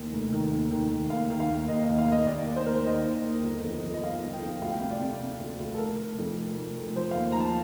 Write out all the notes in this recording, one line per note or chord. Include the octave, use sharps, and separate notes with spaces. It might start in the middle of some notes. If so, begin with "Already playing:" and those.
Already playing: A1 D#2
F1
D#3
D#2
D#3
D#3
D#2 F5
D#3
F5
D#2
D#2 D#5
D#2 D#5
F5
D#2 D#5
D#2 D5
D#2
C5
D#2 A#4
C5
D#3 D#5
D#2
D#2
G1
F2
F2
D#5
G1 F5
G1
G5
F2
D2 F5
G5
C3 F5
D5
C3
C3
D2
D2
A4
F1 A#4
F1
F2
F1
F1
F1
F3 C5
D#2 F5
A#5
F3
A5